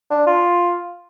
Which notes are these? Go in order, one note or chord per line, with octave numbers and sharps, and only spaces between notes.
D4
F4